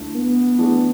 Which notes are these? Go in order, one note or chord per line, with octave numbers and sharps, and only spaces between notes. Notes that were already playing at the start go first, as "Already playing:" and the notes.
Already playing: D2 D3 A3 E4
B3
E3 A3 D4 G#4